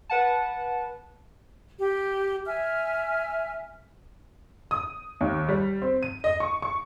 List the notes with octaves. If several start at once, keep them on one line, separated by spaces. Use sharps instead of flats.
B4 F#5 A5
G4
E5 G#5 F6
D#6
D#2
G3
C4
D#7
D#5
C#6
C#6